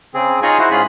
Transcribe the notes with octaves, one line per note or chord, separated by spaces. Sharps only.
C#3 C4 G#4
D#4 F4 G#4 C#5 D#5 G#5
E4 F#4 C5
G#2 C#4 F4 G#4 B5